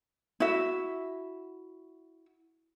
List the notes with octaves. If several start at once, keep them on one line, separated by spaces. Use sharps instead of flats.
E4 F#4 E5